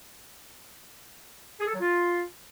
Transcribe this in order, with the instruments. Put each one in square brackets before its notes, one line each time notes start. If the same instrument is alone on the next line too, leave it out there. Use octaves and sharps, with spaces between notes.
[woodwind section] G#4
A4
F#3
F4